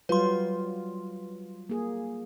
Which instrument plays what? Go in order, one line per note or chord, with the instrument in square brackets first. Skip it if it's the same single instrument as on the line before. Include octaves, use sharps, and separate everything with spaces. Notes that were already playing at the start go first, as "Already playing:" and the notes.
[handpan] F#3 G3 F4 [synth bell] B4 C6
[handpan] A#3 G#4